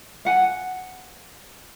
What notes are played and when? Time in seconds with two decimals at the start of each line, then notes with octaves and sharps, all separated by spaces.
0.25 F5 F#5 G#5